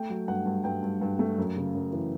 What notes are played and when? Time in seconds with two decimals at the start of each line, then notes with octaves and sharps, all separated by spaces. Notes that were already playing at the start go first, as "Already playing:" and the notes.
Already playing: A3 G5
0.10 F#3
0.28 G2 F#5
0.46 G2
0.64 G2 G5
0.83 G2
1.01 G2
1.19 A3
1.38 F#2
1.56 C#3
1.74 F#2
1.93 E3